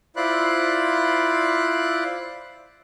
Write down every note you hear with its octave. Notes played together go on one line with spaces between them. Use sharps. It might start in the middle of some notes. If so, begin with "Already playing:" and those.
E4 F4 C5 D5 B5 F#6